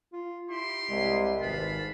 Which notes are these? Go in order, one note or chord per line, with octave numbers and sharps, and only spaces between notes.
F4
E4 G4 C6
C2 G#3
G#1 B4 F5 A5 B5